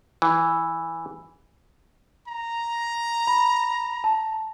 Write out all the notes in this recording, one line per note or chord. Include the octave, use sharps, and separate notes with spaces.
E3
A#5
B5
A5